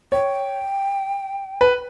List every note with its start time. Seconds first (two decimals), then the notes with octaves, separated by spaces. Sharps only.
0.12 C#5 G5
1.61 B4